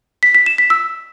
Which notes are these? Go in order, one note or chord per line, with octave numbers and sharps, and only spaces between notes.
B6
B6
E7
B6
E6